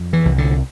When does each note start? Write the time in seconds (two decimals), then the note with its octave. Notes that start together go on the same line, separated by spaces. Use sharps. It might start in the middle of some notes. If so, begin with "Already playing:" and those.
Already playing: F2
0.13 E3
0.25 C2
0.38 D3